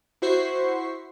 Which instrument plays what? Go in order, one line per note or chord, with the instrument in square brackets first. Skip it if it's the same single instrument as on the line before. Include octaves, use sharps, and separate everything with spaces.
[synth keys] E4 F#4 C5 C#6 B6 C7